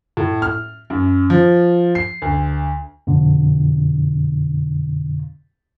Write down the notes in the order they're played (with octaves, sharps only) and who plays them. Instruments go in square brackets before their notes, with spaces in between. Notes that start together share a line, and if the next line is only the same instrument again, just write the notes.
[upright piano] A2
F6
F#2
F3
C7
D2
[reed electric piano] F2 B2 D3